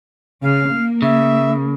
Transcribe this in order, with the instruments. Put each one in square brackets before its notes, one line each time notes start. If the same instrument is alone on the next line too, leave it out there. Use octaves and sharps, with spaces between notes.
[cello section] C#3 [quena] F5
[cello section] A#3
[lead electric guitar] C#3 [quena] E5